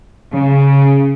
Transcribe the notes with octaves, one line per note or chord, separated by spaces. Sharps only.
C#3